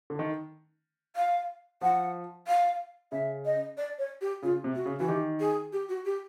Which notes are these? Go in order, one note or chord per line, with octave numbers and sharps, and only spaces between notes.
D3
D#3
F5
F3 F#5
F5
C#3 E5
D#5
D5
C#5
G4
C#3 F4
C3
F#4
C#3
E3 F#4
D#3 G4
G#4
G4
F#4
G4